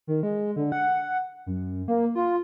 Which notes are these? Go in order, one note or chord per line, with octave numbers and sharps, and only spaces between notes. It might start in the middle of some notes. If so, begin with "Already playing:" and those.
D#3
G#3
D3
F#5
F#2
A#3
F4